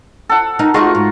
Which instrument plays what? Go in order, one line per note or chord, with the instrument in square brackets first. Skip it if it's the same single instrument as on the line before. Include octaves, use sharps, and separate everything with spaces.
[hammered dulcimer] A4 F#5
[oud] D#4 [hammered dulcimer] A#4
[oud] A3 D#4 G#4 [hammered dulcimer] F4 F#4 C#6
[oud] G#2